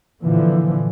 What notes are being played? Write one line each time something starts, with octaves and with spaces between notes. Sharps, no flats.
A#2 D3 E3 F3